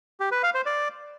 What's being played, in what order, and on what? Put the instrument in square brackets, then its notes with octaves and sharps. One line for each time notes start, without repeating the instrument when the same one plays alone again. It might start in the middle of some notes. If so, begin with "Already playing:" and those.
[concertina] G4
B4
F5
C5
D5